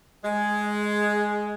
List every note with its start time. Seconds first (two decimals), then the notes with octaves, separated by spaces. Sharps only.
0.24 G#3